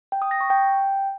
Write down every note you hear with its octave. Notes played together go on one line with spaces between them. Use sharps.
G5
D#6
A#6
C#6
G5